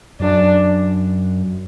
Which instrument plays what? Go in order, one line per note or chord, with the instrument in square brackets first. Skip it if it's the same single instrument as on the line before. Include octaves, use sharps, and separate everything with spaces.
[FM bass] F#2 [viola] D4